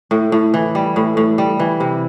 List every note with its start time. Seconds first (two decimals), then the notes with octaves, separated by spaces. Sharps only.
0.11 A2
0.32 A2
0.54 E3
0.75 G3
0.96 A2
1.17 A2
1.38 G3
1.59 E3
1.80 C3